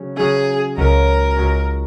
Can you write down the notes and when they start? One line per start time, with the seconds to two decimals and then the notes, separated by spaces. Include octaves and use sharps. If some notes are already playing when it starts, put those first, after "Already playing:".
Already playing: C#3 F#3 C#4
0.17 C#3 F#3 C#4 G#4
0.77 C#2 C#3 F#3 C#4 A#4
1.37 C#2 C#3 F#3 C#4